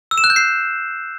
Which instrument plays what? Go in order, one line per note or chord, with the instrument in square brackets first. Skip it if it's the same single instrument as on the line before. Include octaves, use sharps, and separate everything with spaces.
[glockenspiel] E6
E7
F#6
G6
C7